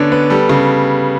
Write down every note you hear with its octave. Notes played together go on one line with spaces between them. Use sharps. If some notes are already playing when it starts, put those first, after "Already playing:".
Already playing: D3 B3 C#4 D4 C#5
B3
G3 A4
C#3